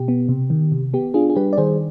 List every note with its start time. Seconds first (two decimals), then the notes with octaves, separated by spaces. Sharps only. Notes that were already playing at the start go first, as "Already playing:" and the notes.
Already playing: B2 G4
0.08 B3
0.29 C3
0.50 D#3
0.72 C3
0.94 B3 G4
1.14 D4 F4 G#4
1.30 G#4
1.36 G3 G4 B4
1.53 D5
1.57 D#3 G#4 C5